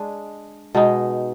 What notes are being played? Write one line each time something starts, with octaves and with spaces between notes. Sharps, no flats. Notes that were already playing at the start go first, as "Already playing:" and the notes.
Already playing: G#3 D4 G#4
B2 G#3 D#4